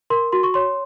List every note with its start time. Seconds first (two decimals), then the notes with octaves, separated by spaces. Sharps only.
0.10 A#4 C6
0.33 F#4 C6
0.43 C#6
0.54 C#5 C6